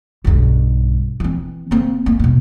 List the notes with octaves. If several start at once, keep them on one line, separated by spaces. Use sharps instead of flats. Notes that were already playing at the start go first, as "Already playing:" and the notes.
B1 G2
E3 C4
A#3 C4
A#3
G2 B2